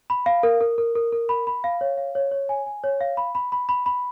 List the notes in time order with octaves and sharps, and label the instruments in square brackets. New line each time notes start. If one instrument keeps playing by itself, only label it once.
[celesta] B5
F5
A#4
A#4
A#4
A#4
A#4
B5
B5
F5
C#5
F5
C#5
C#5
G#5
G#5
C#5
F5
B5
B5
B5
B5
B5